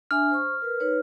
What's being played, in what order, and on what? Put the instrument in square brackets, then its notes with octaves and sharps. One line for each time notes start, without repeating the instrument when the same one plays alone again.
[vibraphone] D4 E5 G#5 [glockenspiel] F6
[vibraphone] C5 C#6
A#4 B4
D#4 B4 C#5